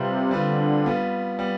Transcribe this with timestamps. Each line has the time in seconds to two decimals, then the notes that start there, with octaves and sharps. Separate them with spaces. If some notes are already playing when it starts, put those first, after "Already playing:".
Already playing: C3 G3 C4 F4 B4
0.31 D3 G3 C4 F4 B4
0.84 G3 B3 F4
1.39 G3 B3